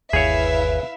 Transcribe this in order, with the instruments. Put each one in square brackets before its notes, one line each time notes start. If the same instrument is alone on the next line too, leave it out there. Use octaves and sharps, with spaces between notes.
[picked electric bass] G1 D#2 [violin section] E4 E5 F5 [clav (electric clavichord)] G#4 C#5 [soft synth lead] B4